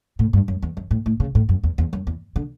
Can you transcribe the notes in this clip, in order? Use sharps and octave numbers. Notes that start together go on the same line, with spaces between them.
A2
G2
F#2
E2
F#2
A2
A2
C#3
A2
F#2
E2
E2
F#2
E2
D3